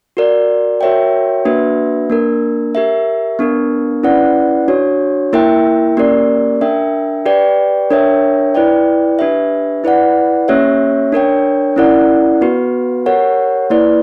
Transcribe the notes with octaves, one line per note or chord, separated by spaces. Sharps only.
F#4 A#4 D5
F#4 A#4 C#5 E5 G5
A#3 D4 F#4 B4 E5
A#3 D4 A#4
G4 A#4 E5
B3 D4 A#4
C#4 E4 B4 D5 F#5
D4 F#4 C#5
A#3 E4 A#4 E5 G5
A#3 C#4 G4 A#4 D5
D4 A#4 E5 G5
G4 B4 D5 G5
D4 A#4 C#5 E5 G5
E4 B4 D5 G5
D4 G4 B4 E5
E4 B4 D5 F#5
A#3 C#4 G4 C#5 E5
D4 A#4 C#5 G5
C#4 E4 A#4 D5 F#5
B3 F#4 B4
G4 A#4 C#5 F#5
A#3 E4 B4 D5